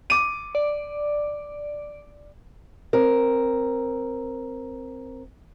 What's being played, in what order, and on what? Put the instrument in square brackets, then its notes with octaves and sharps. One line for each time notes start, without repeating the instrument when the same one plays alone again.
[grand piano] D6 D#7
[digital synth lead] D5
[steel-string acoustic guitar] C4 A#4